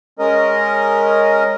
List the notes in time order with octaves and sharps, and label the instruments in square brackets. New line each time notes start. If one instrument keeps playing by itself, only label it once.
[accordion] G#3 C#4 A#4 D#5